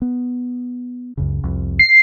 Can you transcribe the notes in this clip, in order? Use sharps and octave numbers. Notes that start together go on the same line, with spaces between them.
B3
C#2 F#2 C#3
C2 F2
C7